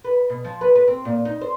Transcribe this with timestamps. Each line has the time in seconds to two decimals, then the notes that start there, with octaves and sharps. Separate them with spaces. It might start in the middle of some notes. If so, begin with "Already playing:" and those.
0.04 B4
0.29 B2
0.44 F3
0.61 B4
0.75 B4
0.88 C4
1.05 A#2
1.25 D#4
1.41 C5